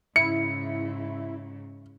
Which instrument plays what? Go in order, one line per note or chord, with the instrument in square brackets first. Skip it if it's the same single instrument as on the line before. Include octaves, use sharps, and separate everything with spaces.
[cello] G#2 C#3 [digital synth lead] E4 [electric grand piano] C#7